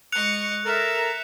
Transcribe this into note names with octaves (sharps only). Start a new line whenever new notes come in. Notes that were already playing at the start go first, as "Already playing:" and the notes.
G#3 D#5 C#6 F#6 C#7 F7
A4 A#4 E5